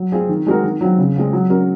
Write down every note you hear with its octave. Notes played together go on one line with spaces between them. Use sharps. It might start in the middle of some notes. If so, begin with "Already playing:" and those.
Already playing: F#3
C4 F4 G#4
D#3
G#3 C4 F#4 A#4
D#3
F#3 C4 F4
C#3
G#3 C4 F4
F#3
C#4 F#4 A#4